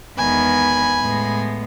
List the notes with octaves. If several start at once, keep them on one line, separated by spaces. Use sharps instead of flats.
E2 D#3 G#3 B3 G#5 B5
A2 G#3 B3